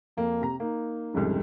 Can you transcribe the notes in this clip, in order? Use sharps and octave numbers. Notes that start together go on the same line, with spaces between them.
F2 A#3
C3 A#5
A#3 D#4
C2 F2 G#2 C#3